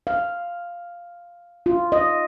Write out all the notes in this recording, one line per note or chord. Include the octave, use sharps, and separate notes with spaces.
F5
F4
D#5